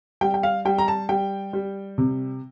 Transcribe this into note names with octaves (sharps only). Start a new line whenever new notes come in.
G3 G5
G5
F5
G3 G5
A#5
A5
G3 G5
G3
C3